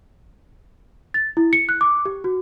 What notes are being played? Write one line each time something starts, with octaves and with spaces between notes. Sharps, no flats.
A6
E4
C#7
F#6
D6
G4
F#4